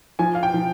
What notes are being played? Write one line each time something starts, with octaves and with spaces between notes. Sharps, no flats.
F3 G#5
F5
G5
F3